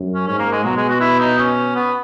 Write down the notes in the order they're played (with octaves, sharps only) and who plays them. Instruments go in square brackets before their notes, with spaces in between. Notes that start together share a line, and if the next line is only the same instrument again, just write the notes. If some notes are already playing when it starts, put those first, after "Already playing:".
Already playing: [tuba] F#2
[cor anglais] C#4
[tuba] G#2 [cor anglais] C#4
[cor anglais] A#3
G#3
[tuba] B2 [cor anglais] F#3
[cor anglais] G#3
F#4
E4
D#4
C#4
B3